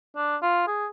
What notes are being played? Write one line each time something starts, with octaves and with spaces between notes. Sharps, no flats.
D4
F4
G#4